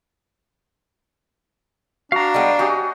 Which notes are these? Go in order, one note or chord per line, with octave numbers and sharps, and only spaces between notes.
D4 F#4 F5 A#5
G3 G#3 B3
C#4 F#4 G4 D#5